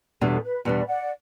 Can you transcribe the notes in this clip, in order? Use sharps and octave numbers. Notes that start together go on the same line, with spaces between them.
E2 B2 G3 D4 A4
B4
E2 B2 G3 D4 B4 D5
D5 F#5